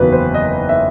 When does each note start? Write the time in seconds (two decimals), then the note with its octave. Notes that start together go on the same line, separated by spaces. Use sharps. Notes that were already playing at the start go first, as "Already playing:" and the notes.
Already playing: F#1 E2 D#3 F#3 B4
0.12 C5
0.34 D#5
0.69 E5